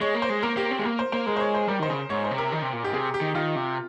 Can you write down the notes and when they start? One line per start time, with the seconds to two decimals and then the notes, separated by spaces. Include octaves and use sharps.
0.01 G#3 C#5
0.15 A#3
0.22 C5
0.30 G#3
0.43 A#3 A#4
0.56 A#3 G4
0.71 C4
0.79 G#3
0.85 A#3 A#4
0.99 C5
1.12 A#3 C5
1.26 G#3 A#4
1.36 C5
1.40 C#5
1.54 C5
1.68 G3 A#4
1.79 D#3 C5
1.89 C#3
2.10 G#2 C#5
2.24 C5
2.31 C3
2.38 A#4
2.52 D#3
2.62 C3
2.73 A#2
2.83 G#2 G4
2.93 C3 G#4
3.14 G4
3.21 D#3
3.35 D#3 F4
3.56 C3